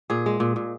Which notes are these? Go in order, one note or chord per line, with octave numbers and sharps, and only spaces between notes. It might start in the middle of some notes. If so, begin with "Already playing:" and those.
A#2 G#4
G#3
A#2
A#2